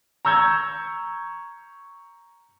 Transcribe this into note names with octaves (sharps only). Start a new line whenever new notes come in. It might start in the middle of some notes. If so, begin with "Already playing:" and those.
A#5 C#6 E6 G6 G#6